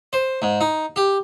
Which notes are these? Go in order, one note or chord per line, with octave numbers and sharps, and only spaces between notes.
C5
G#2
D#4
G4